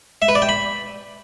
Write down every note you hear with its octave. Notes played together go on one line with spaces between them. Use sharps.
E5
B4
D5
G5
B5